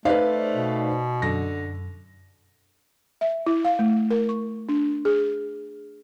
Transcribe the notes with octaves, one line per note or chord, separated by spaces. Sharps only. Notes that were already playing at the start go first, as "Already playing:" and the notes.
A3 D#4 B4 C5 D5 F5
B2
F#2 D3 A#6
E5
E4
F5
A3
A#4
C#6
D4
G#4